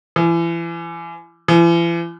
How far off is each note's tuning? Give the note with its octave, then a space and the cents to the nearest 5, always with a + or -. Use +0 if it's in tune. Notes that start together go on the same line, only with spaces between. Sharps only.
E3 +35
E3 +45